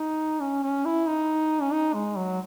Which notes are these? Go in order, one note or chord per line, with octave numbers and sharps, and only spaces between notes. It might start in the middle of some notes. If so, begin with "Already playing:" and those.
Already playing: D#4
C#4
C#4
E4
D#4
C#4
D#4
G#3
F#3